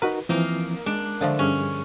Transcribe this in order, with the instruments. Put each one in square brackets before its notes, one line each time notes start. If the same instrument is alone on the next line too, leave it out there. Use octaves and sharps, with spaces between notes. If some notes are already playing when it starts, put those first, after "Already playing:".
[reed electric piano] D#4 F#4 A#4 [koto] B4
[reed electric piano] E3 F3 C4 [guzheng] A#3 D#4
[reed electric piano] G#3 [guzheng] D4
[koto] D3 F3 A3
[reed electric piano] G2 G#4 [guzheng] C#4